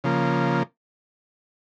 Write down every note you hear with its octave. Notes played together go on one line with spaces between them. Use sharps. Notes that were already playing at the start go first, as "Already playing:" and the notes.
C#3 F3 A#3